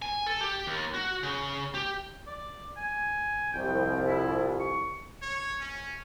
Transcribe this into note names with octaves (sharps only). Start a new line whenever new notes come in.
G#5
A4
G4
D#2
F#4
C#3
G4
D5
G#5
C2 F2 G5
E4
C#6
C#5
C#4